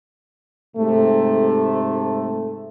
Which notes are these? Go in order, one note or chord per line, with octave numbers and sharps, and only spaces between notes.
G#2 C3 A3